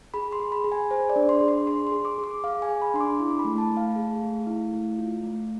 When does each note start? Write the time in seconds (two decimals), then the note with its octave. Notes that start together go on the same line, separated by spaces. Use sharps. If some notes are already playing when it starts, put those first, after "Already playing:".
0.14 G#4 B5
0.32 C6
0.40 G#4
0.52 B5
0.64 G#4
0.72 G#5
0.90 G#4 C5
1.10 D5
1.16 D4
1.29 C6
1.41 G#4
1.48 C6
1.67 G#4 C6
1.87 C6
1.92 G#4
2.05 D6
2.18 G#4
2.24 D6
2.44 G#4 F5
2.62 G#5
2.69 G#4
2.82 B5
2.94 D4 C6
3.00 D6
3.19 E4 D6
3.39 B5
3.45 A3
3.58 A5
3.71 A3
3.77 F5
3.96 G#4
4.22 A3
4.47 E4
4.72 A3
4.99 F4
5.23 A3